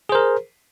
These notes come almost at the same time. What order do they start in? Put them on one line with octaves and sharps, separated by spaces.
G#4 C5 A#4